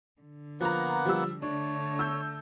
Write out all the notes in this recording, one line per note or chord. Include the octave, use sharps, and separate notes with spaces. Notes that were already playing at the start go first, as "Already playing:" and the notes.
D3
F3 A#3 B3 F#5 A#5
F3 G3 E6
D3 A3 D4 C#5
E6 G6